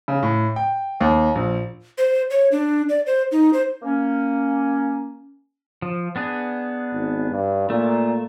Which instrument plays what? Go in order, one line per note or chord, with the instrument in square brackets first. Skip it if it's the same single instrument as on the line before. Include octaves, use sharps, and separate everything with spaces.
[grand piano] C#3
A2
G5
D#2
A#1
[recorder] C5
C#5
D4
D5
C5
D#4
C5
[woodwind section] A#3 C#4
[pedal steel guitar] F3
B3 D4 G#4
[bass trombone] G#1
G2
[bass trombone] A#2 [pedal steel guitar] A3